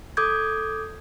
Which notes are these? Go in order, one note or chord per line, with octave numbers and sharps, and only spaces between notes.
A4 D6 D#6 G6 G#6